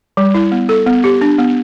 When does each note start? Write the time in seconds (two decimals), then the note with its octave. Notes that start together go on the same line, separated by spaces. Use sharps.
0.17 G3
0.34 E4
0.52 B3
0.69 A4
0.86 B3
1.04 G4
1.21 D4
1.38 B3